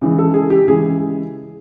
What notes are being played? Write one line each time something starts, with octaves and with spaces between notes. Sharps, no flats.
C#3 E3 G#3
A4
G#4
G4
C#3 E3 G#3 G#4